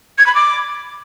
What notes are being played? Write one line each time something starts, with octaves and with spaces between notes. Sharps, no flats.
G#6
B5
D6